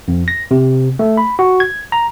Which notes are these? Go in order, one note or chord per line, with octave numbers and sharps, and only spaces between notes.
F2
A#6
C3
A3
B5
F#4
G#6
A#5